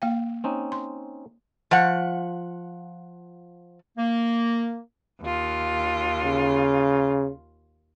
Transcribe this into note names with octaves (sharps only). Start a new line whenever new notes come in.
A#3 F5 G5
C4 C#4 D#4
C6
F3 F#5
A#3
D#2 F4
C#3